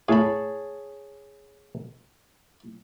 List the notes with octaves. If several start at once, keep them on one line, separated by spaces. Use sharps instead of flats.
A2 G#4 C#5 A5 B5